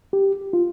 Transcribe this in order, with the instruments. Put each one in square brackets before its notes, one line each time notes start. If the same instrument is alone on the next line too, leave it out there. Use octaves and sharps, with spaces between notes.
[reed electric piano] G4
F4